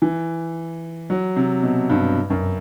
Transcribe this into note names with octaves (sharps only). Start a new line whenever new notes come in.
E3
F#3
C3
B2
G2
F#2